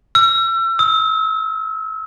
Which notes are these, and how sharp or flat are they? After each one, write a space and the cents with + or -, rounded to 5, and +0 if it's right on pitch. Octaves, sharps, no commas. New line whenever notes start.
E6 +35
E6 -35